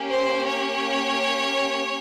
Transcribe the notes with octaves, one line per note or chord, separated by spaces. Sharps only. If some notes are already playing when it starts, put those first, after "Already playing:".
Already playing: A#3 C#4 G4
C5
C#5